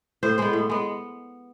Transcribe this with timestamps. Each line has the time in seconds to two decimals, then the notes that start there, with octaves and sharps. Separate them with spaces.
0.23 A2 C5
0.38 G#3 B3 C5
0.53 A2
0.70 G#3 B3